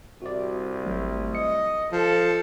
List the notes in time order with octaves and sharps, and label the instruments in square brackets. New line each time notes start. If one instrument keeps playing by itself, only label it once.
[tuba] C2 [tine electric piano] F#4 D5
[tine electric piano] G#1 F#3 A3
[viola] D#5 [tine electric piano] C#7
[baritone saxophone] F3 [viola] A4